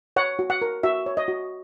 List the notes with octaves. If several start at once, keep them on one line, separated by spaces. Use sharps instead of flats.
C#5 F#5
F#4
F#5
A#4
F#4 E5
C#5
D#5
F#4